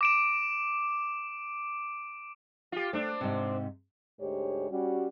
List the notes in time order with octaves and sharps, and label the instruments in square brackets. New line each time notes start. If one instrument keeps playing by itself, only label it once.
[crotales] D6 D7 E7
[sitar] F4 G4
[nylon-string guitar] A3 [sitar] C4 D4
[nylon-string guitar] G#2 C3
[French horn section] D2 G#2 G#3 G4 C5 C#5
G3 C#4 F#4